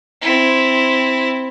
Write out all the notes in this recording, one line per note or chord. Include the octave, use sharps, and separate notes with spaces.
C4 E4